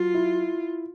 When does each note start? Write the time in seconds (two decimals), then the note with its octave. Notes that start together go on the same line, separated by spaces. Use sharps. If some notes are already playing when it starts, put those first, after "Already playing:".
Already playing: F#3 F4
0.14 E4